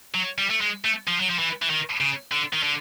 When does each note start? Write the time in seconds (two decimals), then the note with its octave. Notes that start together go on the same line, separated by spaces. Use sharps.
0.14 F#3
0.38 G3
0.50 A3
0.61 G#3
0.84 A3
1.07 F3
1.20 F#3
1.30 F3
1.39 E3
1.62 E3
1.70 D#3
2.00 C#3
2.32 D3
2.53 D#3
2.63 D3